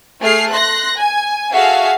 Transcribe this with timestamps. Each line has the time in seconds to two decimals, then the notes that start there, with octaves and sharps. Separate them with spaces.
0.21 A3 G#4 F6 C7
0.51 C6 F#6 A#6
0.95 G#5
1.52 F#4 G#4 A4 E5 F5